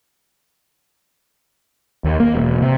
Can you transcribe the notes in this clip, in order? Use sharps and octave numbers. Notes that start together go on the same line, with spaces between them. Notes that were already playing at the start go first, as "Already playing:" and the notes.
D#2
A#3
E1
C3